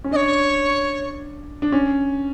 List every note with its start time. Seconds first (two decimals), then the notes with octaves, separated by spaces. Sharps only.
0.04 C#4
0.11 D4 D#5
0.16 C#5
1.62 D4
1.72 C#4